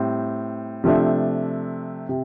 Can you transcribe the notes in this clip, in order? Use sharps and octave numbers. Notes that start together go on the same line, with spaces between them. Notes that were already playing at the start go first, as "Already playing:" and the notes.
Already playing: A2 G3 C4
C3 F3 A3 D4
C3